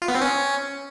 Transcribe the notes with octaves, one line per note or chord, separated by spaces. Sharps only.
F4
B3
C4
C#4